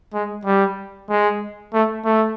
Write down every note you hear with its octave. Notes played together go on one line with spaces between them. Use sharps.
G#3
G3
G#3
A3
A3